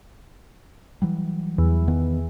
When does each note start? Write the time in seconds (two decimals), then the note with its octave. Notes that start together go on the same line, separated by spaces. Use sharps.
1.02 E3 F#3 G3
1.58 E2
1.88 D#3 B3